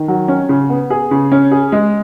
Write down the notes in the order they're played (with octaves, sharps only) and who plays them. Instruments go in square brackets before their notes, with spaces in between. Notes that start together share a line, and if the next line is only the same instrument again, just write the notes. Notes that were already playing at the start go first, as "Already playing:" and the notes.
Already playing: [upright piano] D#3
F#3
C#4
C#3
B3
G#4
C#3
C#4
G#4
G#3